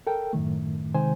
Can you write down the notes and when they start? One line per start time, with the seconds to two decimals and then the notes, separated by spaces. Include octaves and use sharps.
0.07 A4 A#4 G5
0.33 F#2 A2 D#3 A3
0.94 C3 D#3 G#3 C5 G#5